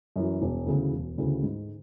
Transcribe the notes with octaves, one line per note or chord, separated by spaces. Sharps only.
F#2 E3
E1
D2 C#3 E3
E1
D2 C#3 E3
G#2